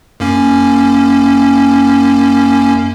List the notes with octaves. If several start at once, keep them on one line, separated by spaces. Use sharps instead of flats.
F#2 A#3 C#4